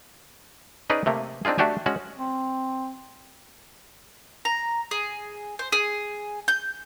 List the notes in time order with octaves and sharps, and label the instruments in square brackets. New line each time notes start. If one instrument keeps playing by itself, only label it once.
[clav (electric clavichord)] C#4 D#4 G#4 B4 D5
C3 A3 A#3
C4 D4 D#4 F4 G#4
A3 D4 F#4 G4 G#5
G#3 C#4 F#4 F#5
[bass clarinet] C4
[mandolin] A#5
G#4
C5
G#4
G6